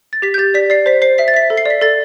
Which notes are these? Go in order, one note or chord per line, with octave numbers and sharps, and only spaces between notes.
A6
G4 B6
G6
G4 A6
D5 B6
D5 C7
C5 B6
C5 C7
E5 B6
A6
E5 B6
A4
C7
D5 B6
A4 A6